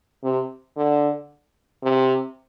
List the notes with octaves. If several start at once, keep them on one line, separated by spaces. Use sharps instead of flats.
C3
D3
C3